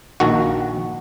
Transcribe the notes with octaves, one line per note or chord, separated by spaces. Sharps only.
A#1 D#3 F#4